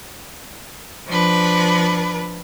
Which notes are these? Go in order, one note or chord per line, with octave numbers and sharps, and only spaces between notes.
F3 D4 B4